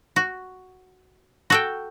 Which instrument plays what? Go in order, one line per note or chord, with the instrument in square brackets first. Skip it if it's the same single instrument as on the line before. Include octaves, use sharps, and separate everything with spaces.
[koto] F#4
F#4 A4 G5